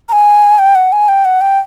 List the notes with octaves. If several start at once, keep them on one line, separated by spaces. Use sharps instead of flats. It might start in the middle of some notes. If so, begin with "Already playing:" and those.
A#5
G#5
G5
F#5
G#5
G5
F#5
G5